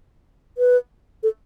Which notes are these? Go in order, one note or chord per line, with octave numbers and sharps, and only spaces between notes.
B4
A4